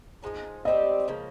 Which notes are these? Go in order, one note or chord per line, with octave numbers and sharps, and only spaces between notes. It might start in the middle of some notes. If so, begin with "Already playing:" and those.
F3 G#3 D#4
G3 C4 G4 D#5
C#3 F3 A#3